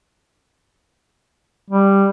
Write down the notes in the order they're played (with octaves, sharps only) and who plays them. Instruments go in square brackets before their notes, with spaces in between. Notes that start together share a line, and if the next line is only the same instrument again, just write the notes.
[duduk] G3